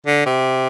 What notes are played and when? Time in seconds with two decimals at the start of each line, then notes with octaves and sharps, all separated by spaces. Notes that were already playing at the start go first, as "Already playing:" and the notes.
0.06 D3
0.26 C3